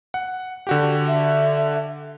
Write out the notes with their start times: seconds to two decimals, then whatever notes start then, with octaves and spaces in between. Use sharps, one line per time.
0.14 F#5
0.67 D3 F#4 G4
1.07 E5